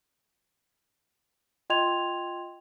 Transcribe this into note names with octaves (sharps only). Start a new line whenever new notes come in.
F4 D#5 G5 C6 G#6 F7